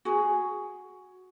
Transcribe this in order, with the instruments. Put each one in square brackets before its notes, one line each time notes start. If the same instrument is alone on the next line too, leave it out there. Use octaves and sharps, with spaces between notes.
[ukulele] F#4 G#4